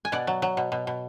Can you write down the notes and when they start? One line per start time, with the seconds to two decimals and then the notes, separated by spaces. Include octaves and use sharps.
0.05 G#5
0.12 B2 D5 F#5
0.27 F#3
0.42 F#3
0.57 B2
0.72 B2
0.87 B2